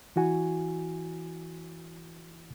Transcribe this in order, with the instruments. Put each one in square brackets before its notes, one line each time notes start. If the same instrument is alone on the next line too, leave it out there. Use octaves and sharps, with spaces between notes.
[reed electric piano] E3 E4 F#4 G#5